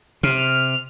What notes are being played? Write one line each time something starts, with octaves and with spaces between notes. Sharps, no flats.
C3 F6